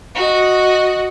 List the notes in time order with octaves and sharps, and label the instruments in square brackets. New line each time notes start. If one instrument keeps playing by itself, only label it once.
[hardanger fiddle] F#4 D#5